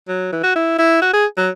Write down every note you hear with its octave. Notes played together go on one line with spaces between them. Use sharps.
F#3
E3
F#4
E4
E4
F#4
G#4
F#3